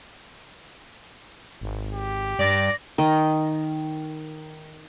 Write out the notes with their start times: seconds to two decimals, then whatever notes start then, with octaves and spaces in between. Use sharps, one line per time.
1.61 G#1
1.94 G4
2.39 G2 D5 A#6
2.98 D#3 D#5